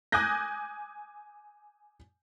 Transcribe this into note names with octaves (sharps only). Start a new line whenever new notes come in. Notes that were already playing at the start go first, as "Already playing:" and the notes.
G#5 D6 D#6 F#6 G6 A#6